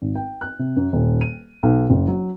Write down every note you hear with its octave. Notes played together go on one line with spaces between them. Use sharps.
G#1
G5
F#6
C3
F#2
D#1
D#7
B1
F#1
F#3